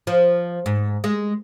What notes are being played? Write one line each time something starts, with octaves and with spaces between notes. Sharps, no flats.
F3
G#2
G#3